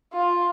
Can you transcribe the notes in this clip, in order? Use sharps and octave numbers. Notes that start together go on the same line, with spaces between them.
F4